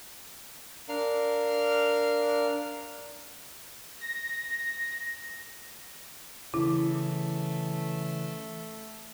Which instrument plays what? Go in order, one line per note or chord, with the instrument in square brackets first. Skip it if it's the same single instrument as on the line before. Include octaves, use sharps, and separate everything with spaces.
[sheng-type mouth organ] D4 A#4 F5 F6
[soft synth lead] A#6
[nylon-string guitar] C#3 E3 [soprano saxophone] A3 [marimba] E4